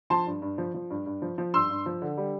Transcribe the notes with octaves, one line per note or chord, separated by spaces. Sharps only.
F3 A5 C6
G2
G2
F3
F3
G2
G2
F3
F3
G2 C6 E6
G2
F3
D3
G3